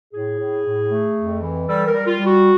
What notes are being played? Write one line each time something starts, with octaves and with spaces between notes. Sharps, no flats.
A2 G#4
A2
A2
A3
F2
E3
G3 A4
A#4
G3
F4
G3
F#4